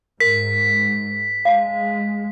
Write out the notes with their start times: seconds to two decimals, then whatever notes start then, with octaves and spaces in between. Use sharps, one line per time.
0.20 G#2 A#4 B6
1.45 G#3 F5 A5